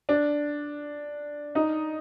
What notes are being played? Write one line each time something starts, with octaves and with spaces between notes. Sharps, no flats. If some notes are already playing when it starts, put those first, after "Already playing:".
D4
D#4